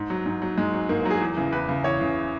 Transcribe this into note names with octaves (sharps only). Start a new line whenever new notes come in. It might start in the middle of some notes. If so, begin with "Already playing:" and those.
Already playing: G#2
F#3
G#2
F#3
G#2 G#3
F#3
G#2 A#3
A#3
F#3
G#4
E2
C#3 E3
E2 B4
C#3 E3
E2 C#5
C#3 E3